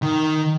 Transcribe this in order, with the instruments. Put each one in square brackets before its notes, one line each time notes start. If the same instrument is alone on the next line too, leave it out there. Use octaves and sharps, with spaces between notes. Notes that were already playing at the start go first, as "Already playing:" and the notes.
[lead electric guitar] D#3